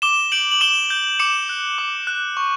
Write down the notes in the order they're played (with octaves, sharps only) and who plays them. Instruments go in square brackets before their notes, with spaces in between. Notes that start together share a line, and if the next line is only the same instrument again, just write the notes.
[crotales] D6 E7 G7
G6 D7 F#7
F#7
D6 E7 G7
G6
D6 C#7 E7
F#6
D6
F#6
C#6